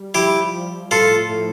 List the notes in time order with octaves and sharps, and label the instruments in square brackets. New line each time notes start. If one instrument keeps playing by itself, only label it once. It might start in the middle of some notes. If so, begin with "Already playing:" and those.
Already playing: [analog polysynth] G3
[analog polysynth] F3 [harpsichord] E4 G4
[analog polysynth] F3
[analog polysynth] A2 [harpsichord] F4 A4
[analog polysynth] A2